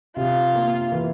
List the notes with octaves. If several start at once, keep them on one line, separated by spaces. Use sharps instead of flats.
C3 F4
A#3
E3